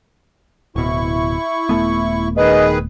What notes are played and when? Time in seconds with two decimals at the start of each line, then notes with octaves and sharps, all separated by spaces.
0.76 D1 B2 E4 C#6
1.69 D#1 A3 B3
2.37 D#3 G#4 B4 D#5